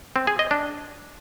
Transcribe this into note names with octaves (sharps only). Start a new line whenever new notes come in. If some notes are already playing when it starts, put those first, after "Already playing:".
C4
G#4
D#5
D4